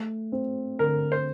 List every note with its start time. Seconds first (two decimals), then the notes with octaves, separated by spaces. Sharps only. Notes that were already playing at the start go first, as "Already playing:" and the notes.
Already playing: A3
0.32 C4
0.79 D3 A#4
1.12 C5